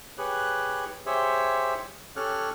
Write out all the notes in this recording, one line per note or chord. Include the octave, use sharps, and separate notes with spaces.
G4 G#4 B4 C#5 F#6
G4 G#4 C5 C#5 E5
C#4 G4 A4 C#5 F6 F#6